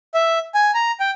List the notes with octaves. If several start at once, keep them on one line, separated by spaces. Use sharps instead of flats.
E5
G#5
A#5
G5